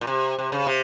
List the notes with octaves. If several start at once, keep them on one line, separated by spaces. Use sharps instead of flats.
A#2
C3
C3
C#3
C3